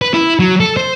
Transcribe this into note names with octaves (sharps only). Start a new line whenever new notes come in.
B4
E4
F#3
A4
C5